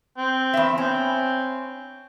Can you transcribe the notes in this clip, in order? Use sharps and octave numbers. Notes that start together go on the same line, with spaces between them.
C4
E2 E5
C4 C#4